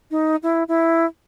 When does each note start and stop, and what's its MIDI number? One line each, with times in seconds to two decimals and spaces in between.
0.11 0.36 63
0.43 0.63 64
0.68 1.06 64